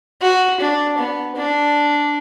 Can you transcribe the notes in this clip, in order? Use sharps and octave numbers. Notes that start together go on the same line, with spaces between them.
F#4
D4
B3
D4